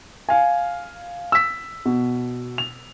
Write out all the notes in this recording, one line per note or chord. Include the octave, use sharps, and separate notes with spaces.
F5 G#5
E6 B6
B2
F7